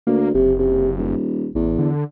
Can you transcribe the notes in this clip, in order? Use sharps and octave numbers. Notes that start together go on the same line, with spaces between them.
D2 A#3
F#1 C3
C3
D#1
A1 E2
D3